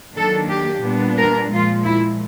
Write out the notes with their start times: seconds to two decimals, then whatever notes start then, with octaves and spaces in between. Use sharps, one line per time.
0.15 D#3 F#3 A#3 D4 A4
0.49 G4
0.83 A#2 G3 B3 D4
1.17 A#4
1.50 A#2 F3 G#3 F4
1.84 E4